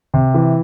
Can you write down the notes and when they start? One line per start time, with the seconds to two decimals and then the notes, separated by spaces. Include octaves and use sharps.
0.14 C3
0.34 E3